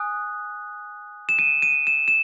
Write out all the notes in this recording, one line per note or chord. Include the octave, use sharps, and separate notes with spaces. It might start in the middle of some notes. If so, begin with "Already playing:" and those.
Already playing: G#5 D#6 F#6
E7
D#7
D#7
E7
E7